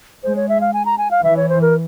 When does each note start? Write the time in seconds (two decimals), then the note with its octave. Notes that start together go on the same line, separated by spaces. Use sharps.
0.23 G#3 C5
0.36 C#5
0.49 E5
0.61 F5
0.73 G#5
0.85 A#5
0.98 G#5
1.11 F5
1.23 E3 E5
1.37 C#5
1.49 C5
1.61 A#4